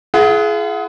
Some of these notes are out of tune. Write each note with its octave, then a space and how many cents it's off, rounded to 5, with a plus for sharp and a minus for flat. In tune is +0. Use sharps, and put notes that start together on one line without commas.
F4 -45 G#4 +25 F#5 +0